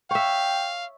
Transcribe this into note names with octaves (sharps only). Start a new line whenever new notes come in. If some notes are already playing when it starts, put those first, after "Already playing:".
C#5 E5 F5 G5